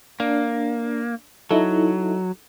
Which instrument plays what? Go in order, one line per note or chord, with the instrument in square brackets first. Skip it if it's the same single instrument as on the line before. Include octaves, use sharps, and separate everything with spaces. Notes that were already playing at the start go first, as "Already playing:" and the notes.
[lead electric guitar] A#3 [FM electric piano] D4
[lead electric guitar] F#3 [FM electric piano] D#4 E4 A4